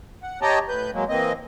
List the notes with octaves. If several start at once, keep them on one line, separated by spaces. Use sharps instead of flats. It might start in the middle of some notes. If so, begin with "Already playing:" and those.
F#5
G4 C#5 D#5 G5 A5 A#5
A2 B4 G6
F#3 G#3 A#3
E3 A#3 C4 D#5